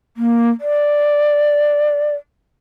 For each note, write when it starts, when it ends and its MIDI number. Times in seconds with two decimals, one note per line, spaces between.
0.17 0.50 58
0.60 2.15 74